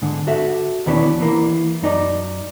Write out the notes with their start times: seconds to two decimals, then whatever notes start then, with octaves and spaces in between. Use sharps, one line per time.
0.02 G#2 D3
0.27 F#4 A4 E5
0.86 D#2 B2 E3 B3 C#4 D4
1.20 E3 A#3
1.82 F#2 D#4 D5